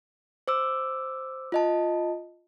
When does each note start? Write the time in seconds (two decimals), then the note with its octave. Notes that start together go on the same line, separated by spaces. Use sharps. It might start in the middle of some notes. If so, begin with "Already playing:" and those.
0.48 C5 D6 E6
1.52 F4 D#5 A5